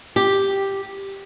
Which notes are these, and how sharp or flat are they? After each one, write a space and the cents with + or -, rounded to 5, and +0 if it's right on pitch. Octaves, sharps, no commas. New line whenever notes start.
G4 +0